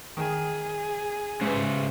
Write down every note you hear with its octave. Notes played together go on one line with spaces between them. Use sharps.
D#3 G#4
G#2 C#3 B4 C5